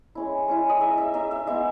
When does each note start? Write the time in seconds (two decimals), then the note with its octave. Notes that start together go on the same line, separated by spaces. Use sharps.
0.15 G#3 C#4 E4
0.48 G#3 C#4 E4
0.69 D#5
0.81 G#3 D#4 E5
0.98 E5
1.14 G#3 D#4 E5
1.31 E5
1.47 G#3 B3 E4 E5